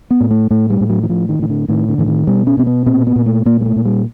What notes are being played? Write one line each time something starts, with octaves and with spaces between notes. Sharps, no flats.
B3
A2
A3
A2 A3
G3
A2
F#3
E3
A2 F3
D#3
A2 D#3
D3
A2 D#3
D3
A2 E3
D#3
B2 G3
C#4
B2 C4
B3
A#2 C4
B3
A#2
A3
A#2 A#3
G#3
A3
A#2
G3